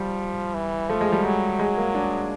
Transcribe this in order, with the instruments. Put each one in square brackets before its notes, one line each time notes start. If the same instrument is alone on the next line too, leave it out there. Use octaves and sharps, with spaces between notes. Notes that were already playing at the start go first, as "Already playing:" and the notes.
Already playing: [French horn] F3 [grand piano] G3
[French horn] E3
[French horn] F3 [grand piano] A3
[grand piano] G#3
G3
[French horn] F#3 [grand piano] G#3
[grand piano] G#3
A#3
D4